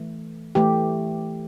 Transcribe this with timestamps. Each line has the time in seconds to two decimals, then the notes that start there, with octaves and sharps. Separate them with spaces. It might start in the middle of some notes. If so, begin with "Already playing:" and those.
Already playing: E3 A3
0.55 E3 A3 G4